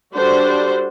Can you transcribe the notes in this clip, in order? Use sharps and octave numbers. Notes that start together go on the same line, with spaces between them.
G3 D4 F#4 A4 C5